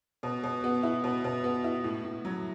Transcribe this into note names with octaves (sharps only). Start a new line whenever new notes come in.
B2
B2
B3
E4
B2
B2
B3
E4
A2
A2
F#3